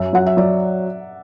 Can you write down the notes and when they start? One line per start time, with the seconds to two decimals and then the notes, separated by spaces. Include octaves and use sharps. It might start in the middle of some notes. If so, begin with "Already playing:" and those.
Already playing: F#2 E5
0.13 F#3 F#5
0.26 E5
0.37 F#3 D5